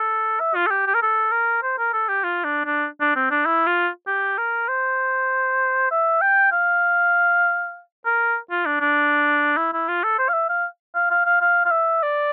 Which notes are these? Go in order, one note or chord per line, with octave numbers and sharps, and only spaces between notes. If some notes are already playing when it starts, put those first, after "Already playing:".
Already playing: A4
E5
F4
A4
G4
G4
A#4
A4
A#4
C5
A#4
A4
G4
F4
D4
D4
D4
C4
D4
E4
F4
G4
A#4
C5
E5
G5
F5
A#4
F4
D4
D4
E4
E4
F4
A4
C5
F5
E5
F5
F5
F5
F5
F5
F5
E5
D5